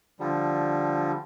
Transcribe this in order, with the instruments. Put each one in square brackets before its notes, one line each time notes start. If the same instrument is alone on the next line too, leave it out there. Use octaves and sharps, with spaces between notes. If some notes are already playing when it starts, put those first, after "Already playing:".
[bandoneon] D3 F3 G3